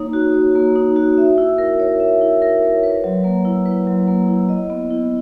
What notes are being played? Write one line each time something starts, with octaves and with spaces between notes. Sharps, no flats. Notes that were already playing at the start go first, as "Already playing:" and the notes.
Already playing: A#3 D#4 C#5
F#4
C#5
A#3
D#4
F#4
E5
E4
A#4
C#5
E5
E4
A#4
C#5
B4
F#3
A#3
E4
B4
F#3
A#3
E4
D#5
B3
E4